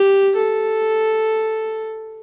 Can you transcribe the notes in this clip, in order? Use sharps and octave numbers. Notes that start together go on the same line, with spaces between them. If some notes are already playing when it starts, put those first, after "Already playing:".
Already playing: G4
A4